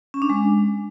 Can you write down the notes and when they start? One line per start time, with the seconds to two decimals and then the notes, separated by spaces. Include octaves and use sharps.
0.14 C#4
0.22 D4
0.30 G#3